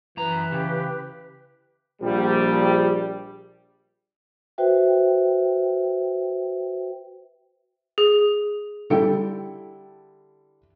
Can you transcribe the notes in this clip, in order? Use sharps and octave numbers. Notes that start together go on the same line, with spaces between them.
F#2 E3 B4 A#5
C#3 G4
A#1 G3
F#4 B4 C5 E5 G5
G#4
D3 G3 E4 A4 G5